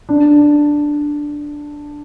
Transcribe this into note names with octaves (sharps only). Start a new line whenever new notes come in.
D4